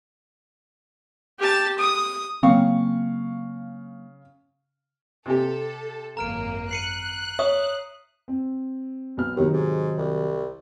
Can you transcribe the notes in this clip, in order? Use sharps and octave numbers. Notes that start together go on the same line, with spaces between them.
G4 A5
D#6
C#3 F#3 A#3 C4 F5 C#6
C3 G4 A4
G#1 F#2 A#3 A#5 F6 D7
F#6 C7 C#7 D#7
C#5 E5 D#6
C4
B1 B3 F6
D#2 C3 D#3 F#3
G#2
C2